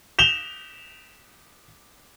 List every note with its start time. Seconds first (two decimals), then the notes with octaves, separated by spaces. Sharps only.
0.19 E7 F7 G7